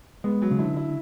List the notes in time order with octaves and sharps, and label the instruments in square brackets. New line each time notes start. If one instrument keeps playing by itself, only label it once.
[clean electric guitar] G#3 [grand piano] B3
[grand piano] F#3
[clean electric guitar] C#3
[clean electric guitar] D3 [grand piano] E4
[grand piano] E4